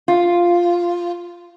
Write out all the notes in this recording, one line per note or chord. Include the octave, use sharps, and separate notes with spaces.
F4